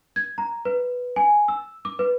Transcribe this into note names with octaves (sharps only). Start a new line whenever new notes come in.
G#6
A#5
B4
G#5
E6
D6
B4